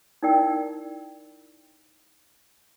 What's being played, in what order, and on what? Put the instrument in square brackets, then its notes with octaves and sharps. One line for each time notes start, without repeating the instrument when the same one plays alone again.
[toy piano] D#4 E4 A#4 D5 G5 E6